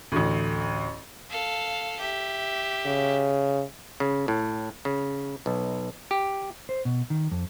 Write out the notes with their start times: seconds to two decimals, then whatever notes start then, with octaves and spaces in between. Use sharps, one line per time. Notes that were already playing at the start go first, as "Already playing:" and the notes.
0.12 A1 D2
1.31 A4 F5
2.00 G4 E5
2.86 C#3
4.00 C#3
4.28 A2
4.85 C#3
5.46 B1
6.11 G4
6.69 C5
6.85 B2
7.10 D#3
7.31 F2